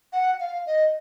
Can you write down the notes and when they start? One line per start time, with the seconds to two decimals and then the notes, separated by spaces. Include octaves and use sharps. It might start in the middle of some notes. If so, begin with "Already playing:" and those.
0.13 F#5
0.40 F5
0.66 D#5